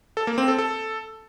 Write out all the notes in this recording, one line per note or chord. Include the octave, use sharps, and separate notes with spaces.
A4
A#3
C4
A4
A4